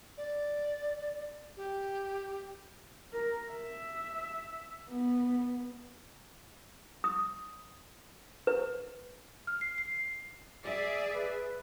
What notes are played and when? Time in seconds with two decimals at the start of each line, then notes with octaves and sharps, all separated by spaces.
0.17 D5
1.57 G4
3.13 A#4
3.51 E5
4.89 B3
7.04 D#6
8.47 B4
9.47 F6
9.61 C7
9.78 C7
10.65 G#4 D5 E5
11.15 B4